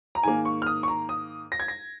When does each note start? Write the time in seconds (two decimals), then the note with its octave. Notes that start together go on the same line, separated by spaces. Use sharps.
0.15 A#5
0.23 G#2 D#3 A#3 G#5
0.45 C#6
0.62 F6
0.67 D#6
0.83 C#6
0.88 A#5
1.09 D#6
1.52 A#6
1.60 G#6
1.68 A#6